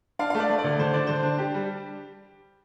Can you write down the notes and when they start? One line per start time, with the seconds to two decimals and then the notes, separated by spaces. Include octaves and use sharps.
0.19 D4 F5
0.30 F5
0.34 A3
0.40 D5
0.50 A3
0.58 D5
0.64 D2
0.79 D3 C5
0.93 D4 D5
1.07 D3 C5
1.23 D4
1.38 D4 G4
1.54 G3